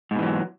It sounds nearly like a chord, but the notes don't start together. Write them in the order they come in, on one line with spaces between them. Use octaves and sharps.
G#2 B2 E3 F#3